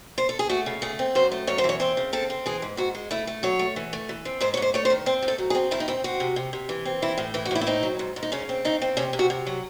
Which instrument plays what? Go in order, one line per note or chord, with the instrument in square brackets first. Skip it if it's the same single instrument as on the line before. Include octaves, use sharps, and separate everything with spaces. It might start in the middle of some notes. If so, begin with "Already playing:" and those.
[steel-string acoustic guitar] C5
A4
G#4
A3 F#4
C#3
A3 G#4
C4
F#2 C5
A3
F#2 C#5
C5
E3 C#5
C4 C5
C#3
C4 A4
C4
E3 G#4
G#2
G#2 F#4
G#3
A3 E4
A3
F#3 C#5
A3
E3
A3
E3
C4
G#2 C5
C#5
G#2 C5
A3 C#5
C5
D#3
C4 C5
A2
A4
F#3
G#4
C4
D#3 E4
D#4
C4 E4
C4 F#4
C3
C3
C3
E3
C4
E3 E4
A2
E3 E4
F#4
A2 E4
E4
C4 D#4
F#3
G#2
G#2
D#4
C#3 C#4
C4
C#3 D#4
C4
C3 C#4
C3
F#4
C3
F#3